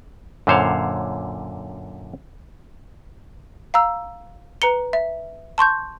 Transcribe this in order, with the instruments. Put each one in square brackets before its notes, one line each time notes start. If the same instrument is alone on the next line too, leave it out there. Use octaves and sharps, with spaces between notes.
[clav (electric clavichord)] F#2 A#2 D3 C5 C#5 F5
[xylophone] F5 A#5 E6
B4 A#5 C#7 G7
E5
A5 C6 C#6 G6